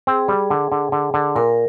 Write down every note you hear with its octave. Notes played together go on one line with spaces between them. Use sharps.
C4 G#4
G3
D3
D3
D3
D3
A#2 A#4